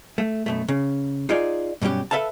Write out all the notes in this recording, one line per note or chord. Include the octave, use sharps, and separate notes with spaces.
A3
F#2 B2 A3
C#3
D#4 F4 G#4 D5
G2 B2 F#3 C#4 G4
A4 B4 E5 F5 A5